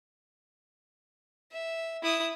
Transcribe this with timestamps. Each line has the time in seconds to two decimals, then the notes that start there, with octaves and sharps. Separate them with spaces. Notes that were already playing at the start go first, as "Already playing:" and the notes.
1.52 E5
2.02 E4 D#6